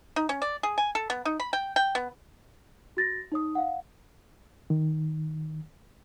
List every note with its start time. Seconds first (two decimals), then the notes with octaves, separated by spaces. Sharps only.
0.16 D#4
0.29 C#4
0.42 D5
0.63 G#4
0.78 G#5
0.95 A4
1.10 B3
1.25 D#4
1.40 B5
1.53 G5
1.76 G5
1.95 B3
2.97 F#4 A6 A#6
3.32 D#4 C#5 D#6
3.55 F5 F#5
4.70 D#3